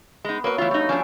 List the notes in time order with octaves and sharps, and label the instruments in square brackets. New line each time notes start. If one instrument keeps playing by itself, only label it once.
[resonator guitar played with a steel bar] G#3 D#4 [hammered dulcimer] B3 B4
[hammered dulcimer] F#3 A4 F5 [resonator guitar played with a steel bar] A#3 B4
[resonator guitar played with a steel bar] E3 F4 [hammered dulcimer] A3 B3 B5
[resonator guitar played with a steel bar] G3 D#4
[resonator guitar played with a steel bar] F3 G3 D4 [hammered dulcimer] C#4 C#5 G#5